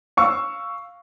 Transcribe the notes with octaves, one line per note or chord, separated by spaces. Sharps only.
F5 C#6 E6